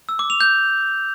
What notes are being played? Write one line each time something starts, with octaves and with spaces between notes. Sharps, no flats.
E6
D6
F7
G6